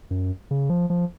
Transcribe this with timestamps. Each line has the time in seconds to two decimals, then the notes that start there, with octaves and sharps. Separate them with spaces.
0.11 F#2
0.51 C#3
0.70 F3
0.90 F3